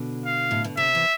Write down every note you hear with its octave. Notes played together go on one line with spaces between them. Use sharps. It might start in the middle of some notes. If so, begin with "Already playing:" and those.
Already playing: B2 D3
F5
A2
B2
C3 E5
E3